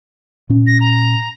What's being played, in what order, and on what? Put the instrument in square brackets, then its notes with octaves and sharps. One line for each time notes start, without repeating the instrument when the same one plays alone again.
[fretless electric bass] A#2 C#4
[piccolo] A#6
A#5